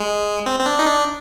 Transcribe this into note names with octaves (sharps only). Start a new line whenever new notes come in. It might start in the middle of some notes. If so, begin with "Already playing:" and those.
Already playing: G#3
C4
C4
D4
D#4
D4